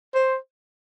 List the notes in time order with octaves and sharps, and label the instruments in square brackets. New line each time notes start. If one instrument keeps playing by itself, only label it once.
[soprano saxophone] C5